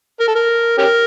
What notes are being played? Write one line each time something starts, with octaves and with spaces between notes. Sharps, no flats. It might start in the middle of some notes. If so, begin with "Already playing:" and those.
A#4
A4
A#4
C#4 G4 A#4